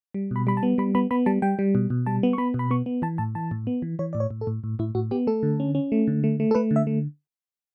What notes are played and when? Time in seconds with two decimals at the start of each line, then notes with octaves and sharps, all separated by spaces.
0.14 G3
0.31 B2 B5
0.47 G3 B5
0.57 A5
0.63 B3
0.78 G3 B5
0.95 B3 B5
1.11 B3 B5
1.26 G3 A5
1.42 G3 G5
1.59 G3
1.75 B2
1.90 B2
2.06 G3 A5
2.23 B3
2.33 C#6
2.38 B3 B5
2.54 B2
2.59 B5
2.71 B3 C#6
2.86 B3
3.02 E3 A5
3.18 A2 A5
3.35 E3 A5
3.51 A2
3.67 B3
3.82 E3
3.99 E3 C#5
4.13 A2 D5
4.20 C#5
4.31 A2
4.41 A4
4.47 A2
4.64 A2
4.79 A2 E4
4.95 A2 F#4
5.11 B3 G4
5.27 A3 A4
5.43 D3
5.60 C#4
5.75 C#4
5.92 A3
6.08 D3
6.24 A3
6.40 A3
6.51 A4
6.55 A3 B4
6.71 D3
6.76 E5
6.87 A3